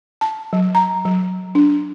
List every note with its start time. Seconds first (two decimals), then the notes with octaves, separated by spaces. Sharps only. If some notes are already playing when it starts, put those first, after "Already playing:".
0.21 A5
0.53 F#3
0.75 A#5
1.05 F#3
1.55 D4